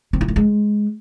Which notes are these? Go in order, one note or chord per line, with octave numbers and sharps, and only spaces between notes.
C4
E4
A3
G#3